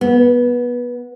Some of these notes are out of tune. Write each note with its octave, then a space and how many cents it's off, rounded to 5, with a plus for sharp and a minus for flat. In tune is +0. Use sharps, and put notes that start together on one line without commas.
B3 -20